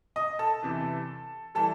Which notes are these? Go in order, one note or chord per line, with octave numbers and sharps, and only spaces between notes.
D#5 D#6
A4 A5
E2 C3 E3
E3 G3 A4 A5